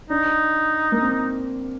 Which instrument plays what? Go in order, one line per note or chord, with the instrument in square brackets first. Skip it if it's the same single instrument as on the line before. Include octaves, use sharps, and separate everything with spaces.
[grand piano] D4 [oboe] D#4
[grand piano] A#3
C4